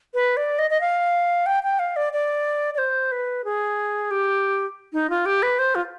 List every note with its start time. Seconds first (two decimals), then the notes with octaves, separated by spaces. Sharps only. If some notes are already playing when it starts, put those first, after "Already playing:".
0.14 B4
0.37 D5
0.59 D#5
0.70 D#5
0.81 F5
1.46 G5
1.63 G5
1.79 F5
1.96 D5
2.13 D5
2.74 D5
2.78 C5
3.12 B4
3.45 G#4
4.11 G4
4.93 D#4
5.10 F4
5.26 G4
5.43 B4
5.59 C5
5.75 F4